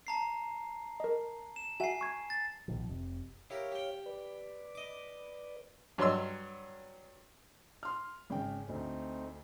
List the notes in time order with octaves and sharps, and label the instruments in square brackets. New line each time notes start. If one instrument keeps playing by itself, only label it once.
[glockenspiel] A5 A#5 C7
[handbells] A#4 D#5
[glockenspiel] E7
[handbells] F#4 E5 F#5 [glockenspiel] G#5 C7
[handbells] C#6 G#6
[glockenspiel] A6
[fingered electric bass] A#1 B2 D#3 F3
F1 C3
[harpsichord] E4 G4 A#4 [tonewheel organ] C#5 F5
[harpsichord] G4 G5
[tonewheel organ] B4 D5
[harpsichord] D#5 D6
[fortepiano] G2 F#3 C#5 C6 E6
[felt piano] C6 F6
G#1 C#3 G5
[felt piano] D2 [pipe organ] A3 C4 D#4